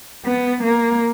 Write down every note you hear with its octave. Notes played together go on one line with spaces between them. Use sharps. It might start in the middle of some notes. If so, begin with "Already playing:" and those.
B3
A#3